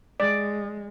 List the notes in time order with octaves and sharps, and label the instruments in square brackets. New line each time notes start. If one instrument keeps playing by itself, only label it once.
[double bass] G#3 [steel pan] D5